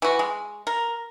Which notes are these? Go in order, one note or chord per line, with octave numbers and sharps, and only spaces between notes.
E3 F#4
G#3
A#4